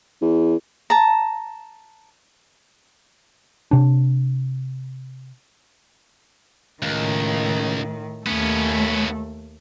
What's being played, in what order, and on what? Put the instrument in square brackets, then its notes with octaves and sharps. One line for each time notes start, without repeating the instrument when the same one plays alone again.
[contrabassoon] E2
[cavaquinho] A5 A#5
[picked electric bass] C3 D4
[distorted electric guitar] C#2 [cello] A2 D#3
[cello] D#2 A3 [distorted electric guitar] B3 C#4